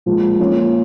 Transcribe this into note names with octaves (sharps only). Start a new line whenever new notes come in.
A#2 F3 G#3
F3 A#3 C#4 F4